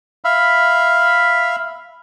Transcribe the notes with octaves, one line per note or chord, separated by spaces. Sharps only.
E5 F5 B5